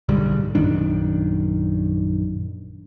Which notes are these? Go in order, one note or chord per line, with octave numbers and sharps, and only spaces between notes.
B1 G#2 D3 G3
A#1 F#2 D#3 D4